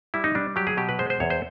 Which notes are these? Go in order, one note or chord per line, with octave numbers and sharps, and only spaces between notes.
G3 E4
D#4
G3 D4
F#3 G4
G#4
B2 G4
B4
G#3 C5
C5
E2 C#5
C5